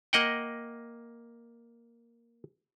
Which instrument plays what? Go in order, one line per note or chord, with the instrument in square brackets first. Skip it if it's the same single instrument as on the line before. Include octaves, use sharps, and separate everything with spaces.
[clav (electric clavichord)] A#3 D#5 F#5 G5